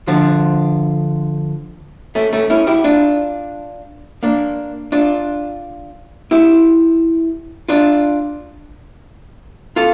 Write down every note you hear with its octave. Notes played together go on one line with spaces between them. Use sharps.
D3 F3
A3 C#4
A3 C#4
C#4 E4
E4 G4
D4 F4
A#3 D4
D4 F4
E4 G4
D4 F4
F4 A4